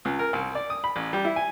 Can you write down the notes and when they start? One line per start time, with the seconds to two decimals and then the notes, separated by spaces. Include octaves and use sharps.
0.05 C#2
0.19 A#4
0.33 C2
0.55 D5
0.70 D#6
0.84 B5
0.96 A1
1.13 G3
1.25 E4
1.36 G#5